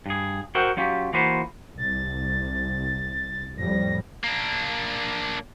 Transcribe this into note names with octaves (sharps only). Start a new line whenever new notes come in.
G2 G#4
F#4 A#4 C5 E5 F#5 G5
F#3 C#4 F4 G4
E3 A#3 F4 F#4 B4 C5
C2 A6
F2 A2 G3 A#6
A#3 D4